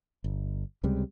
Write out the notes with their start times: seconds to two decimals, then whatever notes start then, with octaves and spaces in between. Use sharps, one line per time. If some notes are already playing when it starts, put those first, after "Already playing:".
0.24 G1
0.83 C#2 C3 G3 G#3